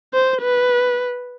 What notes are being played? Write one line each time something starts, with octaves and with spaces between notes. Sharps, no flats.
C5
B4